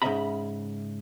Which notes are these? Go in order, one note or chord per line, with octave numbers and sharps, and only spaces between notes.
G#2 C#3 D#5 E5 A#5 B5